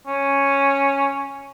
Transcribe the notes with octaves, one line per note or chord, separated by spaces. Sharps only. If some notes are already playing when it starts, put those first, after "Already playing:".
C#4